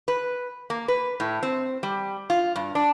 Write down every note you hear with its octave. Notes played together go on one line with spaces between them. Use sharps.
B4
A#3
B4
A2
C4
G3
F4
G2
D4